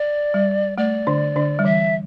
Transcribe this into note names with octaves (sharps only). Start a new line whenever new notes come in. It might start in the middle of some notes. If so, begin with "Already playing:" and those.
Already playing: D5
G3
A3 D5
D3 D4
D3 D4
G3
E3 E5